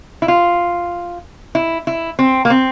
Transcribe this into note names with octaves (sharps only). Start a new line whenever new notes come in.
E4
F4
E4
E4
C4
A#3
C4